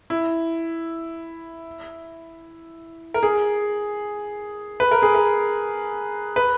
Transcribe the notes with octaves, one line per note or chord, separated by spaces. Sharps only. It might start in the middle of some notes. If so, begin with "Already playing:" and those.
E4
A#4
G#4
B4
A#4
G#4
A#4
B4